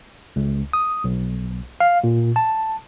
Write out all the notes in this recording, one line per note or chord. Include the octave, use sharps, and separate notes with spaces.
C#2
D#6
B1
F5
A#2
A5